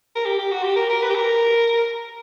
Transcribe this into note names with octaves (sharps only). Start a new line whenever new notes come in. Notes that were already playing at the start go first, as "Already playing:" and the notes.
A#4
G4
G4
F#4
G4
A#4
A#4
B4
G4
A#4